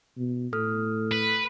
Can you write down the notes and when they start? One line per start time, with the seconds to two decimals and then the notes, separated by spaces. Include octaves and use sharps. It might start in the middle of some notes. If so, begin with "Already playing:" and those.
0.17 B2
0.53 A2 A4 D#6 F6
1.12 B4